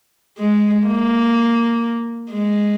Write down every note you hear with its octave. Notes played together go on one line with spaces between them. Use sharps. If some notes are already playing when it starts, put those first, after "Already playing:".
G#3
A#3
G#3